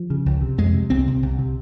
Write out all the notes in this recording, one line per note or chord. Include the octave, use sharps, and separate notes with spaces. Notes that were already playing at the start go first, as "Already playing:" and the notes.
Already playing: F3
C#3
C#2
C3
F2 G#3
C3
C2 C4
C3
C2
C3